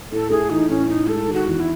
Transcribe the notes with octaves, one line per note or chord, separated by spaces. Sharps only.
A2 A4
A3 G#4
E3 D#4
A2 C#4
A2 D#4
G#3 A4
D#3
F#4
E2
E4